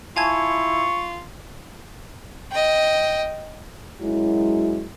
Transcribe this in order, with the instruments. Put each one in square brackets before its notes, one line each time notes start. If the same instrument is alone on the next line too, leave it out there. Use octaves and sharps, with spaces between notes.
[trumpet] E4 [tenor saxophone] F4 [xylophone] G#5 A5 G#6 [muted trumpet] C#6
[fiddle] D#5 G5
[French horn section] F#2 F#3 G#3 E4